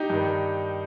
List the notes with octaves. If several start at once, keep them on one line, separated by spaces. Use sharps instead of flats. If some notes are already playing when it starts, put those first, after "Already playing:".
Already playing: D#4 G4
G2 D#3